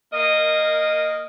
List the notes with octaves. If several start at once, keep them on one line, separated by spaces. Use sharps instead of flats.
A#3 A#4 D#5